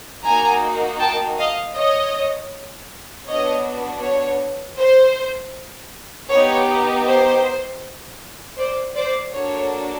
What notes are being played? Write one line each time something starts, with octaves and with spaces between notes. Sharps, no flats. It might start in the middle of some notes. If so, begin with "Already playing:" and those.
A#3 D#4 F#4 G#5 A#5
G5 A5
D#5 F5
C#5 D#5
B3 D4 F#4 C#5 D#5
C#5
C5
B3 D#4 G4 C#5
C5
C5 D5
C5 D5
A#3 D4 F#4 A4 C#5